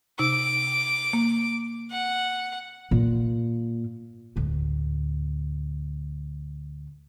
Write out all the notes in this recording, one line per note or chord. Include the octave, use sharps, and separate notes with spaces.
C3 D#4 D6 E6
A#3
F#5
A#2
D2 A2